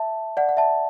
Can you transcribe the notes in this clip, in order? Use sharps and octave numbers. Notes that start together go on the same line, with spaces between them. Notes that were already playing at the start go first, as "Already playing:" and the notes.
Already playing: E5 A5
D5 F#5
F#5
E5 A5